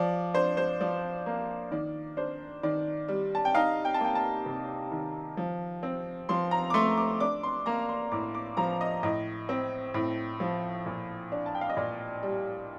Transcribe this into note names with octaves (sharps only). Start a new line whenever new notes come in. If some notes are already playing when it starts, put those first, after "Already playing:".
Already playing: F3 D5
D4 C5
C5
F3 D5
A#3
D#3 D5
D4 C5
D#3 D5
G3
A5
G5
D#4 F5
G5
A5
A#3 G5
A5
C3
D#3
F3
C4
F3 C6
A#5
D6
A3 C6
D6
D4 D6
C6
A#3 A#5
C6
A2 D6
D6
F3 A#5
D#5
A2 D#5
C4
A2
F3
A#2
D4
A5
G5
F5
D#5
A#2 D5
G3